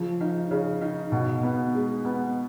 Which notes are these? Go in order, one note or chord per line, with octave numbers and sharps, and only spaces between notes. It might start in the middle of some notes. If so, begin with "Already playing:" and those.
Already playing: C#3 F3
D#4
C#3
D#4
B2
B3
G#3
B3